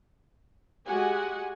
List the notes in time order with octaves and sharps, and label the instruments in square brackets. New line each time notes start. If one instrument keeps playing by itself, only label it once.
[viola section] G#3 F#4 G4 F#5 G#5